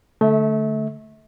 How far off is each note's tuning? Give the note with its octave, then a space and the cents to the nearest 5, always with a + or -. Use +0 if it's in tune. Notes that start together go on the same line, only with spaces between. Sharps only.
D3 +0 A3 -10 E5 -35